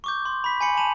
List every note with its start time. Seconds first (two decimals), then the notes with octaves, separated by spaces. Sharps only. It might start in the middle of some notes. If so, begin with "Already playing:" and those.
0.04 C#6 D6 G6
0.25 C6
0.44 B5 B6
0.61 G#5 B5 C#7 F#7
0.77 A5 D#7 F7 F#7